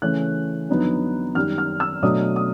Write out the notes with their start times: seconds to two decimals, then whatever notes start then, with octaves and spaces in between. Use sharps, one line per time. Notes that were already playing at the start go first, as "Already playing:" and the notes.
0.02 C#3 E3 A3 C#4 F#6
0.69 F2 D3 F#3 B3 D#4
1.35 F#2 D#3 G3 F6
1.58 F6
1.80 E6
2.02 B2 F#3 A3 D4 D#6
2.36 D#6